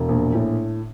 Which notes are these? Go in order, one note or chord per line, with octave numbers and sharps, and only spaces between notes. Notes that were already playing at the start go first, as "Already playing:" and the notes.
Already playing: E1
A#1
A2